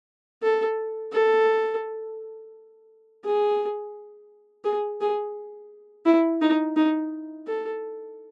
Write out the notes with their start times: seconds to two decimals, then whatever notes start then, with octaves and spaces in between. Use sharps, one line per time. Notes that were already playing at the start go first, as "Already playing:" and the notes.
0.43 A4
1.12 A4
3.25 G#4
4.65 G#4
5.01 G#4
6.06 E4
6.41 D#4
6.76 D#4
7.47 A4